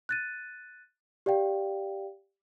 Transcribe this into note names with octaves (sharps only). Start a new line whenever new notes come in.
F#6 A6 D#7
G4 D5 F5 G5